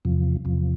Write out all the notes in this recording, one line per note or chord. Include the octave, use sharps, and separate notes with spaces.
E2 C3 F3
E2 C3 F3